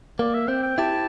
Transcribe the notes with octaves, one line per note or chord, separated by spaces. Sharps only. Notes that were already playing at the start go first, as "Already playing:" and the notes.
A#3 D5
E5
C4 G5
G5
E4 G4 A5